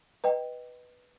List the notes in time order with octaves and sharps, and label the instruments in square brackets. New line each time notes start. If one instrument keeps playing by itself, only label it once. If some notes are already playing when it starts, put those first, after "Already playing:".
[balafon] B4 D#5 G5